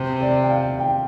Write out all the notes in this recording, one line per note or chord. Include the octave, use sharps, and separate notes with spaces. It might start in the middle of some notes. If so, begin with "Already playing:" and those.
Already playing: C3 C5
D5
G5
F5
G5